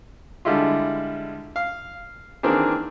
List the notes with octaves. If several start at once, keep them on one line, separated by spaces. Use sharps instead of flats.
D3 G3 G#3 E4 F4
F5
D#3 E3 A#3 C4 D4 G#4